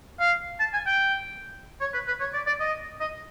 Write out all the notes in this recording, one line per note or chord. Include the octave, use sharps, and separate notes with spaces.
F5
A5
G#5
G5
C#5
B4
B4
C#5
D5
D5
D#5
D#5